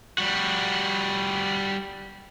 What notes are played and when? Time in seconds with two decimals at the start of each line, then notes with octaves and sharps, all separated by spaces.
0.18 G3 F#4